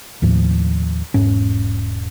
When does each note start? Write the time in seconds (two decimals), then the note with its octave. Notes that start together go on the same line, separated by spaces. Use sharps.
0.22 D#2 A2 F3
1.14 E1 G#2 C#4